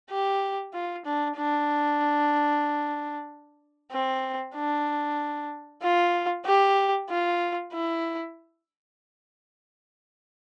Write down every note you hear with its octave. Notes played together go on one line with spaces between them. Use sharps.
G4
F4
D4
D4
C4
D4
F4
G4
F4
E4